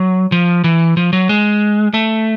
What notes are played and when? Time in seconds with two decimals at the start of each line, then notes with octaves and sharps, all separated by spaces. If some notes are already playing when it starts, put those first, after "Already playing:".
Already playing: F#3
0.32 F3
0.64 E3
0.97 F3
1.13 F#3
1.29 G#3
1.94 A3